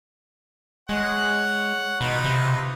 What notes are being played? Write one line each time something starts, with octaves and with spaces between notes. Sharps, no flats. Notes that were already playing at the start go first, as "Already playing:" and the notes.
G#3 C#5 F#5
B2 D#4 F4 B4
C3